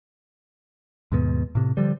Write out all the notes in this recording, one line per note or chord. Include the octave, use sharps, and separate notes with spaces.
D#2 G#2 B2
A2 C3
D3 F3 G3